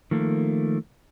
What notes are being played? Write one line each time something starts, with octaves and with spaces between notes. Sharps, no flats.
D#3 F3 A3 A#3